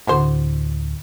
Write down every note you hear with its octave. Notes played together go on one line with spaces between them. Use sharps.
D2 A2 E4 F#4 C5